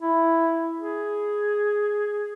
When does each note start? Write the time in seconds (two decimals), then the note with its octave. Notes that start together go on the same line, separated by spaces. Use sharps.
0.02 E4
0.80 G#4